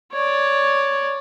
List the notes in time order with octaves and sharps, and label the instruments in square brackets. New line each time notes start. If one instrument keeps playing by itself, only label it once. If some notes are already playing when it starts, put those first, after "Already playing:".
[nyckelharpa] C#5 D5